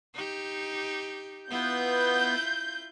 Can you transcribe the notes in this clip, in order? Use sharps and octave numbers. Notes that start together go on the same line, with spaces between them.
D#4 G4
B3 E4 F4 G6